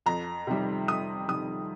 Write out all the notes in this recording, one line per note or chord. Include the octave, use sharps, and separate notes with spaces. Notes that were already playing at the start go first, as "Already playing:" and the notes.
F2 A#5
C3 D#3 G3
F2 D#6
C3 D#3 G3 D#6